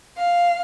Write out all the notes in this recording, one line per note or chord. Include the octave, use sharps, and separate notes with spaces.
F5